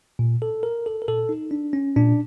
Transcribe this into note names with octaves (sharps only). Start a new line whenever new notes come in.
A#2
A4
A#4
A4
A#4
A#2 A4
D#4
D4
C#4
A#2 D4